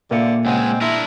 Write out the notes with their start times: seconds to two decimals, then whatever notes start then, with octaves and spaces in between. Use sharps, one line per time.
0.11 A#2 D3 E5 F5 C#7
0.46 C#2 G#3 C4 D#5 F#5 G#5
0.81 D4 E4 A#4 E5 C6 A#6